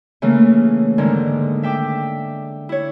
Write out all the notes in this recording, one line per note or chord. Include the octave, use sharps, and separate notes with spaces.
C#3 E3 A3 A#3
G#2 D3 D#3 G#3
E5 G5 D6
E4 C#5